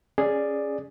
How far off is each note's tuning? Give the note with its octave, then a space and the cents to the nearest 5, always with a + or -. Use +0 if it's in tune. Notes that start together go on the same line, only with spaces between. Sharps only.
C#4 +0 G#4 +0 D5 +10